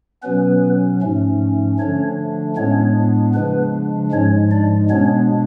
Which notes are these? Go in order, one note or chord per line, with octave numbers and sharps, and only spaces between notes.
B2 F#3 B3 C#4 B4
G#2 F3 A3 C#4
D3 F3 A3 C#4 D4 C#5
A2 G#3 B3 C#4 D4 C#5
C#3 F3 G#3 B3 D4 B4
G#2 F3 G#3 C#4 C#5
D4 D5
B2 G#3 B3 C#4 D4 C#5